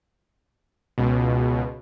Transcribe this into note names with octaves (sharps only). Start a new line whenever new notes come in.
C#2 B2